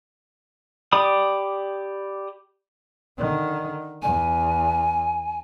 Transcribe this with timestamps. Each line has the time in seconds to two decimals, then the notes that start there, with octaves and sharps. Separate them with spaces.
0.92 G4 D5 B5 D#6
3.18 D3 D#3
4.02 E2 G#5